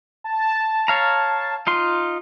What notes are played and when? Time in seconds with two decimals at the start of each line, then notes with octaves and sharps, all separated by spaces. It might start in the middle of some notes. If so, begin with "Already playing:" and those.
0.24 A5
0.88 C#5 F5 A#5
1.67 D#4 F4 C6